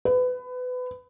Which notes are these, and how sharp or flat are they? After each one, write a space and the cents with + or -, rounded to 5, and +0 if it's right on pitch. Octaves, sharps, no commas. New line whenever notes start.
B4 +25